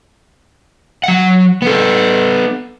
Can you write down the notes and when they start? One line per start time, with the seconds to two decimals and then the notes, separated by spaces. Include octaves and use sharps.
1.04 F#3 F#5
1.62 B3 A4